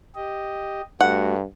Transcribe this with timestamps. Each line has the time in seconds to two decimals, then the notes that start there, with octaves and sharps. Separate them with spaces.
0.15 G4 D#5
1.01 G2 A3 F#4 F#5